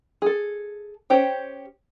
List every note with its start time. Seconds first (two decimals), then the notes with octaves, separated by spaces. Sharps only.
0.22 G#4 A4
1.10 C#4 G4 C5 C#5 G5